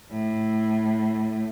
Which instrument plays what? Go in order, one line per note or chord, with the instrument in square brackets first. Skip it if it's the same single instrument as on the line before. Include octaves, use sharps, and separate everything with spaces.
[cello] A2